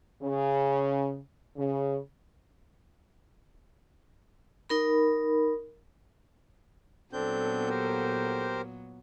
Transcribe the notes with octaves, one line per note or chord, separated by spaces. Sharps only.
C#3
C#3
D#4 A#4 B5
A#2 F#3 B3 C4 D4 A4 G6
G4 A#4 C5